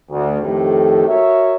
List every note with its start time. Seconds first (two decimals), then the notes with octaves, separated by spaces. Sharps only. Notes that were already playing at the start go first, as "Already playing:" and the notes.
0.10 D2
0.42 F2 A2 D#3 A3 G4 A4
1.06 F#4 A#4 C#5 E5